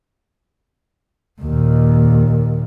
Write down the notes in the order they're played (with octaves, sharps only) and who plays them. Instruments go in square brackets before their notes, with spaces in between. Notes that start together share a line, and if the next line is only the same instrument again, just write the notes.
[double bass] D#2 A#2